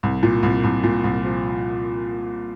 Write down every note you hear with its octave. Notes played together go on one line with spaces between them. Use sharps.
C2
A#2
C2
C2
A#2
C2
F3